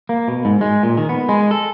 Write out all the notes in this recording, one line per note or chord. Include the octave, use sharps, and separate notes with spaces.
A#3
B2
G#2
G#3
A#2
D#3
B3
G#3
A4